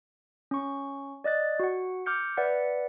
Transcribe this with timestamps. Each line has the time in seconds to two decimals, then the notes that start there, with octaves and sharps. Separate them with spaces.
0.51 C#4 C#6
1.24 D5 D#5 F#6 A6
1.60 F#4 F#5
2.06 D6 F6 G6 C#7
2.37 B4 D5 E5 F#5